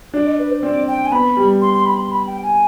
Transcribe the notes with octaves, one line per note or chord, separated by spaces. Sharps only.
D4 D5
D#5
B4
C5
C4 D5
G5
G#5
B3 B5
G3
C6
C6
B5
C6
B5
G5
G#5